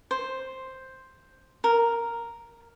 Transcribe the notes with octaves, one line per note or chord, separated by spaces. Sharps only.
C5
A#4